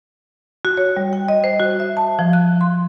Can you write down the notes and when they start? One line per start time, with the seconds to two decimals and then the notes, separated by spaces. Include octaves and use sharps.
0.65 F#4
0.77 C#5
0.97 G3
1.13 G5
1.29 D#5
1.44 C5
1.60 F#4
1.80 E5
1.97 A5
2.19 F3
2.33 F#6
2.61 C6